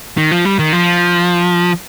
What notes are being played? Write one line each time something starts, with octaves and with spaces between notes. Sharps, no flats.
D#3
F3
G3
D#3
F3